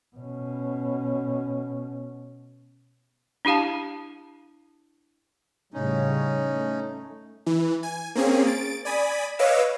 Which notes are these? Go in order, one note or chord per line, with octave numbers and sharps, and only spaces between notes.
B2 C#4
D4 E4 G4 F5 A5
A2 C#3 G3 C#4 D#4
A3
E3
G#5
A#3 C4 C#4 G#4
A6 D7
D5 G#5 B5 D#6
B4 C#5 D#5 F5 D6 E6